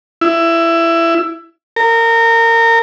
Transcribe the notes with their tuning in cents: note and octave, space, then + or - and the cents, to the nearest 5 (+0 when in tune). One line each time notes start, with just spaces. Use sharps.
E4 +20
A#4 -25